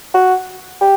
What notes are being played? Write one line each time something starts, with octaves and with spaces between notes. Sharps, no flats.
F#4
G4